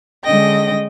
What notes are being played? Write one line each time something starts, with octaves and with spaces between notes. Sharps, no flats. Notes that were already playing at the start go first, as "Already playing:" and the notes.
D3 G#3 C#4 D#5 G5 A#6